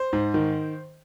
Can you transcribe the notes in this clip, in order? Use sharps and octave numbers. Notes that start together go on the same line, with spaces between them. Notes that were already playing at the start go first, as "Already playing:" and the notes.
Already playing: C5
G#2
D#3